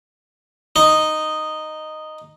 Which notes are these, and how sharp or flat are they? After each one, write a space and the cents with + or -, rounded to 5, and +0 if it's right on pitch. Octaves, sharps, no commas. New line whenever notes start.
D#4 -5